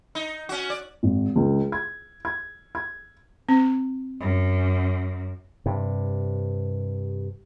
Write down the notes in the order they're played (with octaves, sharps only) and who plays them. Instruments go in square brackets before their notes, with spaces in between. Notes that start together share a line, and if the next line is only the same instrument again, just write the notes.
[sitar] D#4
C#4 F#4
D5
[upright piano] G#1
C#2
G#6
G#6
G#6
[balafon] C4
[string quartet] F#2
[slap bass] G2 C3